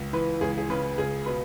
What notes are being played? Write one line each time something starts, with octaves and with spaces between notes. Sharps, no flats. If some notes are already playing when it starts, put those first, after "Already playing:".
Already playing: C#2
E3 B4
C#2 G#4
G#4
C#3 B4
C#2 G#4
B2 B4